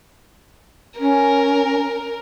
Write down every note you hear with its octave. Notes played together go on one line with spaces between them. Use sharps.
C#4 A#4